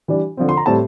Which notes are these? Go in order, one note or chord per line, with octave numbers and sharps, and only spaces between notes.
E3 G3 D4
D3 F3 C4
C6
A#5
A2 G3 C4 A5